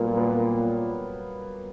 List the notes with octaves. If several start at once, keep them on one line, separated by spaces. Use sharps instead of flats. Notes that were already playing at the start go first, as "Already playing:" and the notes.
Already playing: A#2 F#3 G3 A#3 B3
B3